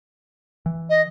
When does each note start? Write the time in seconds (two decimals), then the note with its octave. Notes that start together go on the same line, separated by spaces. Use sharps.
0.66 E3
0.90 D#5